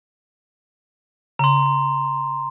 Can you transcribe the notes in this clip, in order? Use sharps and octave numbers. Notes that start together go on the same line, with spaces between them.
C#3 A#5 C6